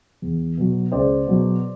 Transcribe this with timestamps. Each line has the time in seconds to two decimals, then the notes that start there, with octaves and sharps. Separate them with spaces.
0.22 E2
0.57 B2 F#3
0.92 C#2 C5 D5
1.27 B2 F#3